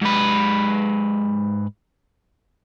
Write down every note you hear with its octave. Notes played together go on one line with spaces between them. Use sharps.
G#2 B4